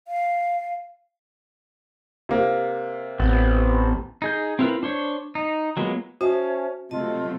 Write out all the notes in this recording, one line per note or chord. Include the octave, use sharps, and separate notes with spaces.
F5
C3 A#3
A1 B3 C4
D#4 G#4 G6
C4 E4 F4 A#4 B4
D4 C5 C#5
D#4
F#3 G#3 A#3 B3 F4
C#4 F#4 C5 E5 A5
C3 F#3 A3 F4 D#5 A5